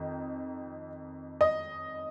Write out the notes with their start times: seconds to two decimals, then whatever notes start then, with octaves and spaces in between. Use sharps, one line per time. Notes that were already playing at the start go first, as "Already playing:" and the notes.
Already playing: F2 D#3 D#4
1.41 D#5